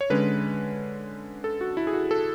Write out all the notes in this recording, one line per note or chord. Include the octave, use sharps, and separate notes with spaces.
C#5
D3 G#3 C#4 B4
A4
F#4
E4
G#4
F#4
A4